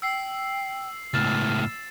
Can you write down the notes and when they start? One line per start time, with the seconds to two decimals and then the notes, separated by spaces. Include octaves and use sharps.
0.02 G5 E6 C7
1.14 C#2 A2 F6 A6 E7